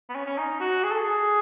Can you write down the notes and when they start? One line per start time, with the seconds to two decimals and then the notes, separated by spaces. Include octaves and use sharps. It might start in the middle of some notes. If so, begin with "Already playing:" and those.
0.09 B3
0.15 C#4
0.26 C#4
0.38 D#4
0.60 F#4
0.83 G#4
0.91 A4
0.99 G#4